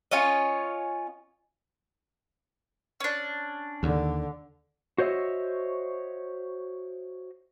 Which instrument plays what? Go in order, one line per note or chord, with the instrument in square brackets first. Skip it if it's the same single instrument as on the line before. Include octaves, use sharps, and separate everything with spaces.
[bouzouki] C#4 F4 C#5 D#5
[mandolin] C#4 D4
[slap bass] D#2 [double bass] D3
[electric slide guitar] F#4 C5 C#5 D#5 E5